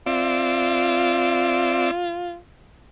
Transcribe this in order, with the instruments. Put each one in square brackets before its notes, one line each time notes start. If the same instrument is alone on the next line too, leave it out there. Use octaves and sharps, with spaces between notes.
[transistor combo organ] C4 D5 E5 [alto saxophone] F4